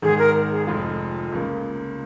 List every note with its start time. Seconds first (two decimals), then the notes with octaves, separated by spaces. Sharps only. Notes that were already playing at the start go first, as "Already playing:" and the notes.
0.02 G#1 G#2 D#3 G#4
0.19 A#4
0.51 G#4
0.67 F1 F2 F3 G#3 F4
1.32 C#2 C#3 A#3